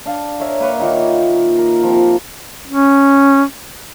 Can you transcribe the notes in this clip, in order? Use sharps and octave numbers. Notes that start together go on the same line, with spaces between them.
D4 F5 A5
A#4 C#5 E5
A#3 B4 C#5
A#2 D#3 D#4 E5
A#4
C3 F3
C#4